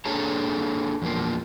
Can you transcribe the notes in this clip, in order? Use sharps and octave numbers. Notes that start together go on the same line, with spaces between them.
A#3 D4 G#4 A4 C#5 A#5
E2 F3 A#3